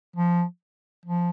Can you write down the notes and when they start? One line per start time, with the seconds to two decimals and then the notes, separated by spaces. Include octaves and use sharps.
0.16 F3
1.05 F3